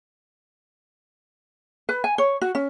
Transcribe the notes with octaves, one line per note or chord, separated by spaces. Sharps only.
B4
G#5
C#5
F#4
C#4